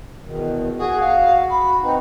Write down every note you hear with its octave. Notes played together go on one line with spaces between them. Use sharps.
E2 B2 D#3
F#4 G#4
F5
B5
C4 D#4 B4